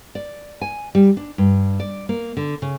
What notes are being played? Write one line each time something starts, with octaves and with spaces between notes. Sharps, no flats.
D5
G#5
G3
D4
G2
D5
A#3
D3
C#3